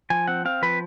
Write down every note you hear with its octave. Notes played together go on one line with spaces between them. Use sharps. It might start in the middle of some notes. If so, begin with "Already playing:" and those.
F3 G#5
C4 F#5
C4 F5
F3 B4